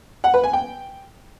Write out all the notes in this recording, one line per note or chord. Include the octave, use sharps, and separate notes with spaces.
F#5
B4
G#5
G5